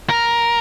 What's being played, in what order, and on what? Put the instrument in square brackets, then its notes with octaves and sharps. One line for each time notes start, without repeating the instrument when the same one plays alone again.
[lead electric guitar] A#4